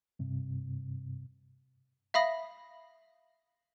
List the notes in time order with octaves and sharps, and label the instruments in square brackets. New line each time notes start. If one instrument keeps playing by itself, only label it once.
[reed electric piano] G2 C3
[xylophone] E5 F5 B5 D#6 A#6